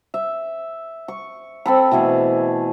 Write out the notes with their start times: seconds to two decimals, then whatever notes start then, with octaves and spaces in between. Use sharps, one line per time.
0.14 E5
1.08 C#6
1.66 C4 A4 B5
1.91 B2 E3 A3 G#4